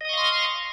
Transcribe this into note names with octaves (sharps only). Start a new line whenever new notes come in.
D#5 F5 C6 C#6 D#6